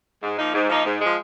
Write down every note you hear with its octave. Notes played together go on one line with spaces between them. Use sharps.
G#2
F3 A#3 D#4
G#2
F3 A#3 D#4
G#2
F3 G#3